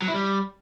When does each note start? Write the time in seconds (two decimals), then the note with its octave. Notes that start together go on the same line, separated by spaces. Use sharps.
0.02 F#3
0.08 E4
0.14 G3